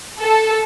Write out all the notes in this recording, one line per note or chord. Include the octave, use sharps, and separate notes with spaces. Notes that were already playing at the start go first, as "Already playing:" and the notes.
A4